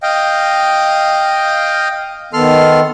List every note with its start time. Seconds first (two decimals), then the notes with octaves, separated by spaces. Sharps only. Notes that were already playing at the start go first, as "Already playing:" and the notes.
0.03 D#5 F5 G5
2.33 D#3 B3 A4 C6 F6